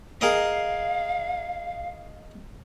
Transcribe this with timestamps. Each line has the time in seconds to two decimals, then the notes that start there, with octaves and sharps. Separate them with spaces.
0.21 G#4 A#4 D#5 F5